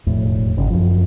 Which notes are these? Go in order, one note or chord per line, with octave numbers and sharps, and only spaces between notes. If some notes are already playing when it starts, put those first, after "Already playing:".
E1 F2 A2
G#1 C#3
F#2 F3